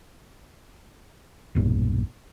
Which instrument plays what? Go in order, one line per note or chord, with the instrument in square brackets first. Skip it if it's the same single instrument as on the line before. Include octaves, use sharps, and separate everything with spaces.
[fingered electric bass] E1 B1 G2 A#2